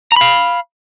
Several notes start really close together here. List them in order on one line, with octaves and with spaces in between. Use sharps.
A#5 B5 F5